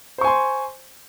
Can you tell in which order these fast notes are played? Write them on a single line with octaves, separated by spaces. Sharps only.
C5 C#6 G#5 C6